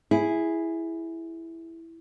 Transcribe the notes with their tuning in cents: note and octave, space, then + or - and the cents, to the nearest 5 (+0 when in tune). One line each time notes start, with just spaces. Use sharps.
E4 +0 G#4 +0